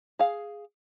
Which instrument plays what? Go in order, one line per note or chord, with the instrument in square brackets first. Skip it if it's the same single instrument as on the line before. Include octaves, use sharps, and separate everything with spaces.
[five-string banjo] G#4 F5